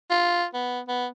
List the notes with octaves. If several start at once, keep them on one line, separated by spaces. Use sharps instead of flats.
F4
B3
B3